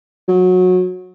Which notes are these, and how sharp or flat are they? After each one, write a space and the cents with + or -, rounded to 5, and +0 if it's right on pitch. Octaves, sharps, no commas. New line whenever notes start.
F#3 -20